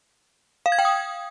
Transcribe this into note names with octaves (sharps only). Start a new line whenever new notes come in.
F5
G#6
G5
D#6